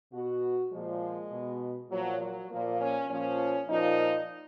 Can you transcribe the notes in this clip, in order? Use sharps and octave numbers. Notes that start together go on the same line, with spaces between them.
B2 F#4
A#2 F3 G#3
B2
A#2 F3 F#3
F#3
A#2 F3 A#3
C#4
A#2 F3 C#4
A#2 F3 D#4